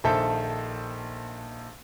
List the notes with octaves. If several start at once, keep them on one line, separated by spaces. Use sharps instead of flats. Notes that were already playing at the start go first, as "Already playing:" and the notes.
A#1 D#3 A4 C5 E5 A5